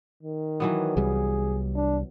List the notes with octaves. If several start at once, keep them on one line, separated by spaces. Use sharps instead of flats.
D#3
E3 F#3 B3
C2 G3 G#4
D4